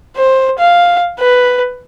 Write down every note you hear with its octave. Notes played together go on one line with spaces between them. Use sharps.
C5
F5
B4